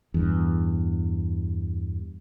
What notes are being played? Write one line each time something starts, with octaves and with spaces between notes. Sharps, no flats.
E2 G2